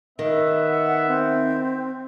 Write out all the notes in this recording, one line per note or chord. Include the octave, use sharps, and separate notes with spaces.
D#3 B3 E5
F#5
C4